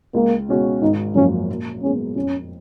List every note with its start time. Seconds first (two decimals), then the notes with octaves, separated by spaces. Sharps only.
0.14 C#2 A#3
0.49 B2 G#3 C#4 F#4
0.82 G#1 D#4
1.15 F#2 F3 A#3 C#4
1.49 A#1
1.82 A#2 G#3 B3 C#4
2.16 F2 C#4